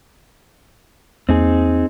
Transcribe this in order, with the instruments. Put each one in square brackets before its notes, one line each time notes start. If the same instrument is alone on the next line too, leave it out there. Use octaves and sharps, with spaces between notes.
[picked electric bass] E2 A#3 [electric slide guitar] C4 D#4 G#4